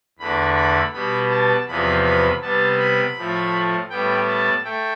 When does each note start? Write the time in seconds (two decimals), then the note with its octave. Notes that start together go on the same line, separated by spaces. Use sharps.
0.19 E2 D3 A3 B5
0.56 B5
0.93 B2 G3 B3 B5
1.31 A5
1.68 E2 C3 F3 B3 B5
2.05 B5
2.42 C3 G3 B3 A5
2.79 B5
3.16 A2 F3 A3
3.90 A2 G3 B3 G5
4.28 A5
4.64 A3 G5